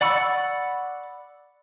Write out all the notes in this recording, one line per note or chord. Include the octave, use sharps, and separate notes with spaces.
D5 F#5 B5 C#6 E6